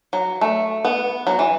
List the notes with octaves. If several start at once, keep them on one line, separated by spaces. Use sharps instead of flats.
F#3
A3
B3
F#3
E3